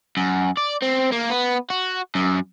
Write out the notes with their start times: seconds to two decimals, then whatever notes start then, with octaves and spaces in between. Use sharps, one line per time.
0.17 F#2
0.57 D5
0.82 C4
1.12 A#3
1.30 B3
1.70 F#4
2.15 F#2